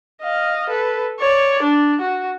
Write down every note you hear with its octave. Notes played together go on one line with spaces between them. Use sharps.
D#5 F5
A4 B4
C#5 D5
D4
F#4